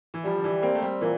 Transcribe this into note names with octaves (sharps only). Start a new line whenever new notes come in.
E3
F3 G3
D3
E3
A#3 C4
A3
G3
A#2 E3